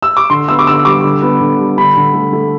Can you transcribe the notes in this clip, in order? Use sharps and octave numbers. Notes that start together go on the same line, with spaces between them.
E6
D6
D3 C6
B3 E6
D6
D3 E6
G3 D6
D3
B3
D3
G3
D3 B5
D3
A3
A3